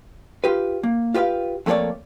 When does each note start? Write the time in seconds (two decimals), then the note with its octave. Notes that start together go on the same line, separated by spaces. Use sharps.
0.44 F4 G4 B4
0.83 A#3
1.14 F4 G4 B4 E5 F5
1.66 F2 A3 A#3 A4 C#5 D5